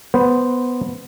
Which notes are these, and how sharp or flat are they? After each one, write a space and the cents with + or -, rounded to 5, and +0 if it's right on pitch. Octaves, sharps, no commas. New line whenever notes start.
B3 +0 C5 -5